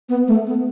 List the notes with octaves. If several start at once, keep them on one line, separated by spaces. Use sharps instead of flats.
B3
A3
B3